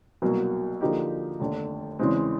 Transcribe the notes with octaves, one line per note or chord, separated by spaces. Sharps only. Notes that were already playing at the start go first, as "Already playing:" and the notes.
C2 B2 F#3 A#3
D3 F3 A#3 D#4 G4
F1 D#2 D3
E2 C#3 E3 G#3 C4